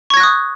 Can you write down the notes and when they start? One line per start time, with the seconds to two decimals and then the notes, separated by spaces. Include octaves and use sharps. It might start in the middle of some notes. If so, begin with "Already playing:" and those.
0.10 C#6
0.14 G#6
0.17 A#6
0.20 F#6
0.23 D#6